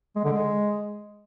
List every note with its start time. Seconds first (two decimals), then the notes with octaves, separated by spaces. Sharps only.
0.16 G#3
0.24 D3
0.32 G#3